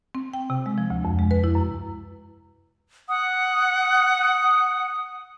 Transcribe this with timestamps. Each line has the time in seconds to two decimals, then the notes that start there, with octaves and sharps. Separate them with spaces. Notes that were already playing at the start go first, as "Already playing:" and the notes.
0.15 C4
0.33 G5
0.50 C3
0.66 G#3
0.78 F3
0.90 D2
1.05 F2
1.19 G#3
1.31 B4
1.44 E4
1.55 F#2
3.09 F#5 D#6